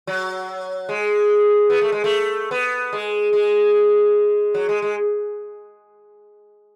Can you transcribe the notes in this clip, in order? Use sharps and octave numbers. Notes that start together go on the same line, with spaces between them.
F#3
G#3
B3
A3
G#3
A3
B3
G#3
G#3
F#3
G#3
G#3